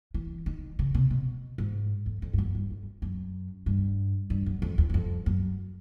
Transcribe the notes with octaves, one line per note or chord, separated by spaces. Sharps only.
E3
D#3
C#3
C3
B2
G#2
F2
F2
G2
F#2
G2
F2
F#2
G2
G2
F#2
F2
E2
E2
F2
F#2